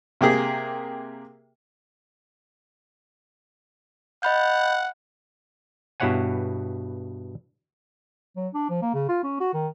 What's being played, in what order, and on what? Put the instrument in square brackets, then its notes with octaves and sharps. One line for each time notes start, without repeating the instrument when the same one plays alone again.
[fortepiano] C3 A#3 G4 G#4
[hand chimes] D#5 B5 G6 [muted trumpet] F#5
[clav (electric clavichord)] G2 B2 E4 C#5 F#5 G#5
[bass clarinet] F#3
D4
F3
A#3
C#3
F4
C#4
F#4
D#3